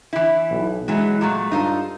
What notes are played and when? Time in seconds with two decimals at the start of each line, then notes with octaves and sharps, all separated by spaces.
0.13 E3 E4
0.50 B1
0.88 E3 F#3 G#3
1.21 A#2 F#3 A3
1.52 G2 D#4 F4 A4